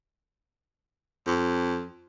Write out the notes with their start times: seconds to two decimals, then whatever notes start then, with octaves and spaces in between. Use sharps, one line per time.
1.27 F2